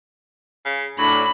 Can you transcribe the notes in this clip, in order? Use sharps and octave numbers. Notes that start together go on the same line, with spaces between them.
C#3
A2 F#3 D4 B5